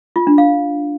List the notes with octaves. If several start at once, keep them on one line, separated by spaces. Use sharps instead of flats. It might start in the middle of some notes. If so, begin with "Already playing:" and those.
F4
D4
F5